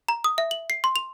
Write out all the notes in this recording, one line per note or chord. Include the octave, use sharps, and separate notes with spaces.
A#5
D#6
E5
F#7
C7
C6
F7